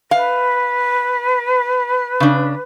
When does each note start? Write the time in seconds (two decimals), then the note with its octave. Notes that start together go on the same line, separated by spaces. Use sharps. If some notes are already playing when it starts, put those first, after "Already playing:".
0.11 B4 F5
2.20 C#3 D4